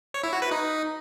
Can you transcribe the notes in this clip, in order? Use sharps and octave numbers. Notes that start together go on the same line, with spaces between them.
C#5
E4
F#4
B4
D#4